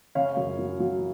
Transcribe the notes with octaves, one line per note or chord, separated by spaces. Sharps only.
C#3 C#5 F5
F#2
F#3
F#3